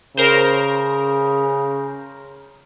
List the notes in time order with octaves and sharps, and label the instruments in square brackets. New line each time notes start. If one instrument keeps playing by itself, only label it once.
[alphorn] C#3 [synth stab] A#4 C5